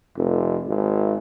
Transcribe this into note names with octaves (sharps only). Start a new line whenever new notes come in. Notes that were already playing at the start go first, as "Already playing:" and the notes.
F1
G#1